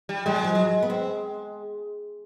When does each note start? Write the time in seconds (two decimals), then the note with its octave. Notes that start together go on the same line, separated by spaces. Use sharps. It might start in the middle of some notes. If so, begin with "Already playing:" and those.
0.09 G3
0.26 G3 G#3
0.36 F#3
0.44 F3
0.55 F#3
0.82 B3
0.90 C4